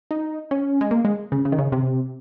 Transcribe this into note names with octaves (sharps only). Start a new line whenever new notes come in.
D#4
C#4
G#3
A#3
G#3
C#3
C#3
D#3
C#3
C3